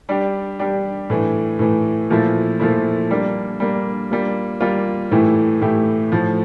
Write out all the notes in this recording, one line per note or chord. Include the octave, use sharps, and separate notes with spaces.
G3 D4 G4
G3 D4 G4
A2 E3 A3
A2 E3 A3
A#2 F3 A3 E4
A#2 F3 A3 E4
G3 A#3 D4
G3 A#3 D4
G3 A#3 F4
G3 A#3 F4
A2 E3 A3 E4 G4
A2 E3 A3 E4 G4
A2 F3 A3